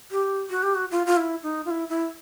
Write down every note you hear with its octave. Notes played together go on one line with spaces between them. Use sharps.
G4
F#4
G4
F#4
F4
F4
E4
D#4
F4
E4
E4